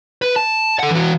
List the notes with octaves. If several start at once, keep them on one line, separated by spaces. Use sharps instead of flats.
B4
A5
A4 F#5
E3 F#4